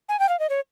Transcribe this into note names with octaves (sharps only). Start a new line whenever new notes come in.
G#5
G5
F5
D#5
C#5